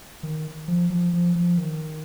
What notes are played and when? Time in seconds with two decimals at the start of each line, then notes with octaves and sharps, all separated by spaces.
0.23 D#3
0.68 F3
0.90 F3
1.13 F3
1.35 F3
1.58 D#3